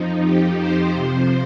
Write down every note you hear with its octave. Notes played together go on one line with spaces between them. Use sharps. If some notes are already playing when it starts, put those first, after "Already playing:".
Already playing: F2 F3 D#4
G4
C5
F2 C3 F3 C5